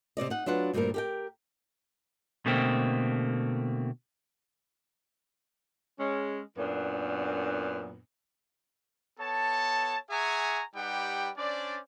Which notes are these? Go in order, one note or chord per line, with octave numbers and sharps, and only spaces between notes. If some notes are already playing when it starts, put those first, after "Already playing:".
C3 D#3 D5 D#5
D#4 F#5
F#3 D4 F4 B4 F#5
D2 G2 A#2 G3 C4 A#4
G4 A#4 G5
B2 D3 A3 A#3 C4
G#3 C#4
F#2 A#2 B3 D4
B3 A4 C#5 A5
G#4 E5 F#5 G#5 A#5 C#6
G3 D#4 G4 B4 F#5 G5
C#4 D4 C5 D5